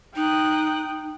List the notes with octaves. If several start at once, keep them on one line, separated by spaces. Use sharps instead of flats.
D#4 G5 D#6 F#6